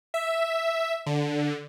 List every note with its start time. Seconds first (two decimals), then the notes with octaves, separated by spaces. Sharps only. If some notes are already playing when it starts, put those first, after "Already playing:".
0.14 E5
1.06 D3